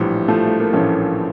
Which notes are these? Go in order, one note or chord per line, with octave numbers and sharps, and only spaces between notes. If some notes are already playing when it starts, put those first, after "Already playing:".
Already playing: A#1 A2 E3 G3
F3 A3
A3
A#3
A#1 A2 E3 A3 C#4